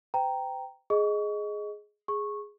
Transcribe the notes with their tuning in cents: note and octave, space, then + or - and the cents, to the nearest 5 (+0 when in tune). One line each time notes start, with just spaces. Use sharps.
C5 -45 G5 +0 A#5 +0
G#4 +10 D#5 +0 C#6 +30
G#4 +0 C#6 -15